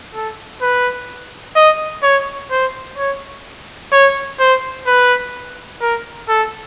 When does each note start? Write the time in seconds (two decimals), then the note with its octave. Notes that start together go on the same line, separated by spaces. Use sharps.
0.14 A4
0.62 B4
1.56 D#5
2.03 C#5
2.51 C5
2.98 C#5
3.92 C#5
4.40 C5
4.87 B4
5.81 A#4
6.29 A4